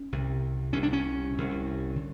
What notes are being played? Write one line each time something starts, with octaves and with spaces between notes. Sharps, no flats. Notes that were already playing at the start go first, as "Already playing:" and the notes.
Already playing: C#4
C2 C3
C2 C3 C#4
D4
C#4
C2 C3
D3